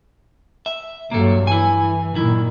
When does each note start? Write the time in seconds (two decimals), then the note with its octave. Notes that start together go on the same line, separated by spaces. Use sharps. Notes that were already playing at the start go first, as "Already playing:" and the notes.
0.66 E5
1.11 G2 F#3 A#3 A4
1.47 E3 E4 G#5
2.16 A#2 D#3 F#3 E4